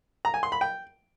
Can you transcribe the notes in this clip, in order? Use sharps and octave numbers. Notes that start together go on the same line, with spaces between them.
A#5
G#5
C6
B5
G5